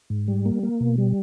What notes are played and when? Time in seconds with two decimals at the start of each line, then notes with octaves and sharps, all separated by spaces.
0.10 G#2
0.28 G3
0.46 A#3
0.63 A#3
0.80 B2
0.98 G3